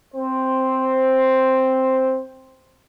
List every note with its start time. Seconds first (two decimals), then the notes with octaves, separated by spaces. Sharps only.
0.15 C4 C5